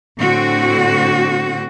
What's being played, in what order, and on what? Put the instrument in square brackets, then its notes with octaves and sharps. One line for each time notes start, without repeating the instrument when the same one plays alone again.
[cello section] A2 D3 C4 F#4